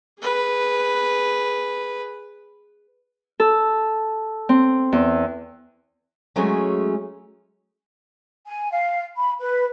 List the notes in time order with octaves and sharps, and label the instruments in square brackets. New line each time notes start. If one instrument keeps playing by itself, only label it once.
[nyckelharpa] G#4 B4
[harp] A4
C4
E2
[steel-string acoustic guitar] F#3 G#3 A3 C#4 F#4 G#4
[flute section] G#5
F5
B5
B4